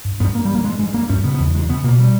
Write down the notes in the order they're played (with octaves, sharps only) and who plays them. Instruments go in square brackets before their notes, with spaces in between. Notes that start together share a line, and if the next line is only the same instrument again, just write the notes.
[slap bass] G2
G2 B3
G2 A#3
G3
G2 A#3
G2 G#3
G2 G#3
G2 A#3
G2 C#4
C#3 B3
B3
E2
C#3 G#3
C#3 B3
B2 A#3
G3